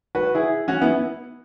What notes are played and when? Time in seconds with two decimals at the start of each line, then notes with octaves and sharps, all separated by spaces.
0.15 F#4 B4
0.35 E4 G#4
0.68 C#4 F#4
0.81 B3 E4